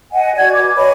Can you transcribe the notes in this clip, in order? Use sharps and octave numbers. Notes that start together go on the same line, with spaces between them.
D#5 F#5 G#5
F#4 D5 G#6
B4 D6
C#5 D#5 G#5 B5